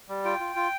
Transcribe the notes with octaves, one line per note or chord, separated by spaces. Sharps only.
G3
F4 G5
F4
F4